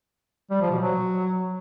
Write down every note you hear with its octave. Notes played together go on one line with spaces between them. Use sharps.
G3
F3
B2
F#3